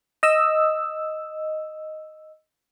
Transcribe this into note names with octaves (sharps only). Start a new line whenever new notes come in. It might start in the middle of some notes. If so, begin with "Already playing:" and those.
D#5 E6